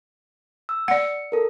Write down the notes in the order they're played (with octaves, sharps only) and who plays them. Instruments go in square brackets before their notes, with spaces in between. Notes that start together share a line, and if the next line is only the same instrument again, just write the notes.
[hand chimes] E6
[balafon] D5 F#5 [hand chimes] C#7
[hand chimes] A4 A#4